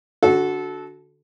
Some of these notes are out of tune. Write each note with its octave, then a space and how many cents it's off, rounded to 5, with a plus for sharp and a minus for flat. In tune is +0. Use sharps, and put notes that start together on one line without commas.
D3 +0 F#4 +0 A4 -20